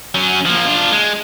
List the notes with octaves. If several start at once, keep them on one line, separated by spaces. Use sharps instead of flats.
F#3 C#4
F3 A#3
D4 F4
G#3